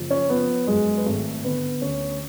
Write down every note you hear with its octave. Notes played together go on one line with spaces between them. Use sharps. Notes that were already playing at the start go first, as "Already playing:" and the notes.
Already playing: F#1 F3
C#4 C#5
F3 B3 B4
F#2 G#3 G#4
B4
G#1 A3 A4
D3 B3 B4
D2 C#4 C#5